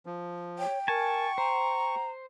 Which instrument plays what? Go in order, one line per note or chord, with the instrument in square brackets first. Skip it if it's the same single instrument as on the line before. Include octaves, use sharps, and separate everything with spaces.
[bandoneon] F3
[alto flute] C#5 [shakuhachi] G5
[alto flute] A#4 [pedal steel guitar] G#5 A5 [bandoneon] C#6
[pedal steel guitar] C5 [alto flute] A#5